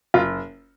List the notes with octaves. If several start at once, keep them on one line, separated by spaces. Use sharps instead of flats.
F#1 F4